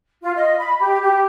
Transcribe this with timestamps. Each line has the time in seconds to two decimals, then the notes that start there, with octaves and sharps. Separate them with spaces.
0.22 F4
0.36 D#5
0.59 B5
0.80 G4
1.02 G4